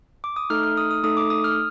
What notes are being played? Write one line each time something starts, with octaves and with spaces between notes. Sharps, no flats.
D6
D#6
A3 D#4 A4 F6
F6
D#6
D#6
A3 D#4 A4 D#6
D6
D#6
F6